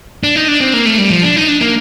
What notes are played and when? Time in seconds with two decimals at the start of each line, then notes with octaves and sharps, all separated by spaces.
0.24 D4
0.36 D#4
0.48 D4
0.60 C4
0.74 A#3
0.85 A3
0.98 G3
1.10 F3
1.23 D4
1.36 D#4
1.48 D4
1.61 A#3